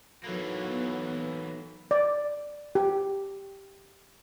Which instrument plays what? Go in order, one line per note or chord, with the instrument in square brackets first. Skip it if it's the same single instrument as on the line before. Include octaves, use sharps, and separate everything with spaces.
[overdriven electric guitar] E3 A#3 [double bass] F#3 [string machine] B3 [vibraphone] D#4 A4 B5
[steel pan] D5
G4